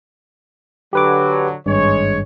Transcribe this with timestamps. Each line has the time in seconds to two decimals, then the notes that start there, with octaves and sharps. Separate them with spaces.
0.93 D3 F#3 G4 B4 D6
1.66 G#1 G2 G#3 C#5